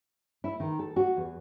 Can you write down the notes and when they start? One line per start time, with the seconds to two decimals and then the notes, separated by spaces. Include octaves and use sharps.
0.44 E4
0.60 D#3
0.79 A4
0.96 F#4
1.17 E2